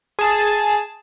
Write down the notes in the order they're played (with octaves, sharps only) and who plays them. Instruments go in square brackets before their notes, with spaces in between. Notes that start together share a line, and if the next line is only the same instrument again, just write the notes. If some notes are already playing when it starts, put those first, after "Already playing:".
[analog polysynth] G#4 A5